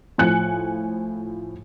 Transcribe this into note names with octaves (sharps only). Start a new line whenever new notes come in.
A2 F3 G#5 F#6 C#7